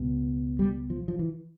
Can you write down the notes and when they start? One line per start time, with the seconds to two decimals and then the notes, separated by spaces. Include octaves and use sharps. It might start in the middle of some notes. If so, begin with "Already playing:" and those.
Already playing: C#2 B2
0.59 G3
0.90 F3
1.08 F3
1.19 E3